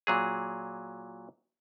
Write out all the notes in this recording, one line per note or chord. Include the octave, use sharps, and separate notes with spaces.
A#2 F#3 G#4